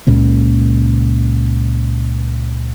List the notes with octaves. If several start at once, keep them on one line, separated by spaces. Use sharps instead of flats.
C#2 A#2 C#3 A#3